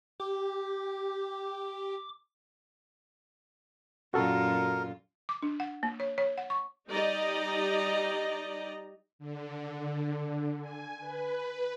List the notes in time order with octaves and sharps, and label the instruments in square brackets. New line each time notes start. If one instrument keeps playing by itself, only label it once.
[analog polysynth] G4 [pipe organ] D6
[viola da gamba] F#2 A#2 F4 [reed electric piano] F#4 A4 [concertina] A#4
[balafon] D6
D4
F#5
A#3
C#5
C#5
F#5
C#6
[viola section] G3 D#4 G4 D5 D#5 A#5
[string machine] D3
G#5
B4